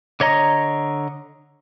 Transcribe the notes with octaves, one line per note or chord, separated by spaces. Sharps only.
D3 C#5 D#5 A#5